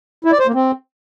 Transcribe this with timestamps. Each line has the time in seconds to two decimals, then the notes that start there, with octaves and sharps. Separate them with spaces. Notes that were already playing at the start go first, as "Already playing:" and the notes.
0.25 E4
0.32 D5
0.39 C5
0.47 A#3
0.54 C4